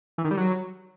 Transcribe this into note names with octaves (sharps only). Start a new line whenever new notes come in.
E3
D#3
G3
F#3